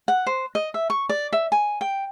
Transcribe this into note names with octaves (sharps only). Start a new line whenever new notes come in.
F#5
C5
D#5
E5
C#6
D5
E5
G#5
G5